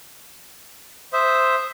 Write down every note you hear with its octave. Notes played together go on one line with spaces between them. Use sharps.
C5 E5 D#6